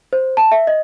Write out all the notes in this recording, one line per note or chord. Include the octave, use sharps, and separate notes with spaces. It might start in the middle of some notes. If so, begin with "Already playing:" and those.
C5
A5
E5
D#5